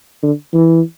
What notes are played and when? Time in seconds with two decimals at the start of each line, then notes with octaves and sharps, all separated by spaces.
0.23 D3
0.53 E3